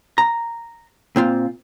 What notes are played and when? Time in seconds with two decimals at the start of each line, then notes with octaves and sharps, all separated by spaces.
0.18 A#5
1.16 A#2 C4 F4